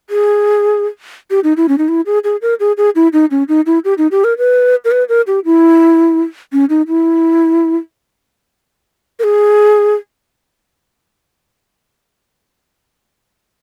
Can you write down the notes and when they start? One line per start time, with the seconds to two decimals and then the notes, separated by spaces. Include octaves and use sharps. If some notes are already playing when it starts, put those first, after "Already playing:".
0.10 G#4
1.31 G4
1.44 D#4
1.57 E4
1.68 C#4
1.78 D#4
1.89 E4
2.06 G#4
2.24 G#4
2.42 A#4
2.60 G#4
2.77 G#4
2.96 E4
3.13 D#4
3.31 C#4
3.49 D#4
3.66 E4
3.85 G4
3.98 D#4
4.11 G4
4.24 A#4
4.38 B4
4.85 A#4
4.91 B4
5.09 A#4
5.27 G4
5.45 E4
6.53 C#4
6.70 D#4
6.88 E4
9.19 A#4
9.24 G#4